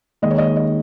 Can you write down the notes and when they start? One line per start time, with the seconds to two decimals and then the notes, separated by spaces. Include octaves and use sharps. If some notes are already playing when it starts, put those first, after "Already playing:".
0.22 D#2 D#3 G#3 D#5
0.31 C#5
0.38 D#5
0.56 D#5